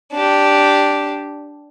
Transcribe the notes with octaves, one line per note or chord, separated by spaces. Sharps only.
D4 G4